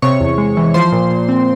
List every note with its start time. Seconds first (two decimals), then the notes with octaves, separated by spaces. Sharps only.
0.02 C3 C#5 C#6
0.21 E2
0.38 G#3
0.57 E3
0.74 F3 C5 C6
0.92 A#2
1.11 A#2
1.29 C4